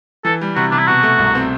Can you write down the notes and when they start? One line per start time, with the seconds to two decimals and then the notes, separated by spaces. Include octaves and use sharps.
0.25 E3 A4
0.41 G3
0.56 C3 F#4
0.71 C3 D4
0.79 E4
0.87 B2 F#4
1.03 A3
1.19 C2
1.35 C4